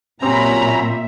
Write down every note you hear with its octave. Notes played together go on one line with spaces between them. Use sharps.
A#2 F#3 C4 C#4 G4 E5 A#5 B5